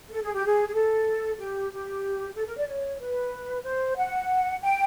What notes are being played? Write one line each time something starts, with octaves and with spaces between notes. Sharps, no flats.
A4
G#4
G4
G#4
G#4
A4
G4
G4
A4
A#4
D5
C#5
B4
C5
F#5
G5